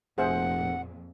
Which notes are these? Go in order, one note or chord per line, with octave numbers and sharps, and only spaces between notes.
F1 F2 A#2 G#4 C5 E5 F#5